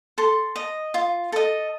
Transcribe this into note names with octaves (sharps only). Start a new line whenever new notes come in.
A4 C6
D#5
F4
A4 D#5